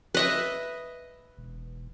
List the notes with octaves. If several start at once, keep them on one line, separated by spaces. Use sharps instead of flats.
B4 D#5 E5
E1